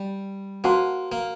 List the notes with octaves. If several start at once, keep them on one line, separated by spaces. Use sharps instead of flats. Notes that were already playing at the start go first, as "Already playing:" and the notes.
Already playing: G3
A#3 F#4 C5 F#5 A5 C6
A#3